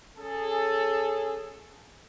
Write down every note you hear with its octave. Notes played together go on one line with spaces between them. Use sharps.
C#4 G#4 A4